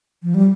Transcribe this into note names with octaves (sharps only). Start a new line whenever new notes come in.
F3
G3